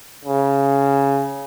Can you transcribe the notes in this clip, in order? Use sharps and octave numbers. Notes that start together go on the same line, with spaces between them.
C#3